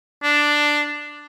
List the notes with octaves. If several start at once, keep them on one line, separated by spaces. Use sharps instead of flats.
D4